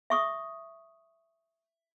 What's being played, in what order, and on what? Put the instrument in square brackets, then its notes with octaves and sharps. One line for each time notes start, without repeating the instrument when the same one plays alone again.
[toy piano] E5 C#6 D#6